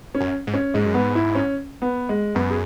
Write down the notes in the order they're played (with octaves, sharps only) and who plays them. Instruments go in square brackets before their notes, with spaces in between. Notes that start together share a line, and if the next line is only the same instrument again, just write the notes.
[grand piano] C#4
[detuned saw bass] F#2
G#2
[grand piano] C#4
[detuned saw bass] G#2 [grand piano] G#3
[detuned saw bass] F#2
[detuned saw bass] G#2 [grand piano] B3
[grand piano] E4
C#4
B3
G#3
[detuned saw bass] F#2 [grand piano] B3
[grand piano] G#4